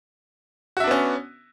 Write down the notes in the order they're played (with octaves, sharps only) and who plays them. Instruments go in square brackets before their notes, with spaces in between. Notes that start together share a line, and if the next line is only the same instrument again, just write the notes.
[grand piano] F#4
E5
D4
B3
C#4